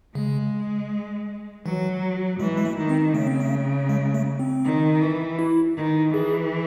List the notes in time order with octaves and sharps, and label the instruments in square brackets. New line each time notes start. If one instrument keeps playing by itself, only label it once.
[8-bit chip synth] C#3 [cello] G#3
[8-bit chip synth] E3 [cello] F#3
[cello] E3 [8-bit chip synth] G#3
[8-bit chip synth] G#3
A3
[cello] D#3
[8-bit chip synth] C4
[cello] C#3 [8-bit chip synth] A3
[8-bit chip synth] C4
A3
G#3
A3
C4
[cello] D#3
E3
[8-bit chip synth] E4
[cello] D#3
[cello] E3 [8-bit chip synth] G#4